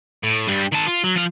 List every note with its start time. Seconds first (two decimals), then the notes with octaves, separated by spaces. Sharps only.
0.23 A2
0.47 G2 G3
0.72 D#3 A5
0.87 F4
1.04 F#3
1.16 F3 F5